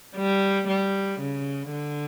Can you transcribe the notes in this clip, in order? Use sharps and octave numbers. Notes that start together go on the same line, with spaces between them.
G3
G3
C#3
D3